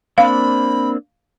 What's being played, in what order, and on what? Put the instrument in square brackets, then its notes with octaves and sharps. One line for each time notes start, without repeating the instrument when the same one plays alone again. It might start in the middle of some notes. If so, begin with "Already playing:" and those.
[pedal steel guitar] A#3 C4 D4 [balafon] F5 [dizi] B5